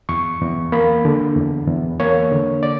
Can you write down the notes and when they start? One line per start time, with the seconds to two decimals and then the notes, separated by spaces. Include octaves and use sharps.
0.09 E2 C#6
0.41 E2
0.72 A#3 B5
1.05 D3
1.36 E2
1.67 E2
2.00 A#3 C#5
2.32 D3
2.63 D5